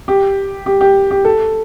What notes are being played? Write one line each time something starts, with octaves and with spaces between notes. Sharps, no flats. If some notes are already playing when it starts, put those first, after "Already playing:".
G4
G4
G4
G4
A4